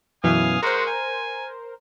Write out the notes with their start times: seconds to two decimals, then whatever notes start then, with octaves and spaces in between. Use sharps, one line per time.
0.24 F#2 B2 E3 F5 G#5 D#6
0.63 G#3 F#4 A#4 C5 F#5
0.87 G#5